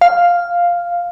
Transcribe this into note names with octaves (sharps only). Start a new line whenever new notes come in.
F5